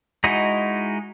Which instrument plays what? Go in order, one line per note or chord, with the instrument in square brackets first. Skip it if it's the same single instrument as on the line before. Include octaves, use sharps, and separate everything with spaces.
[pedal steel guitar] G#3 D#4 E4 F#4 D#5